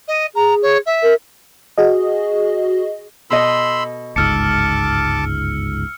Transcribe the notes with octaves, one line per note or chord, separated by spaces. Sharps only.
D#5
G#4 A#5
C#5
E5
A#4
F#4 G#4 D#5
B2 A4 D#5 B5 C6 E6
G1 C#2 G#2 A5 D6 E6 F6 C#7